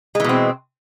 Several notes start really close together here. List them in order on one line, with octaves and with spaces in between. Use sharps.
G#3 E3 B2 C4